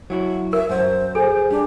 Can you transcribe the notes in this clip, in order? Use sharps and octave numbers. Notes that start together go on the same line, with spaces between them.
F#3 E4 F#4
A#4 E5
F#2 F#3 C5
G#4 A4
G3 D4